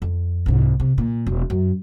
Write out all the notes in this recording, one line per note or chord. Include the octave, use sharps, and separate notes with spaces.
F2
C2 G#2
C3
A#2
E1
F#2